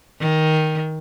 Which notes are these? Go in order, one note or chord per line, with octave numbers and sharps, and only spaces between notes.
D#3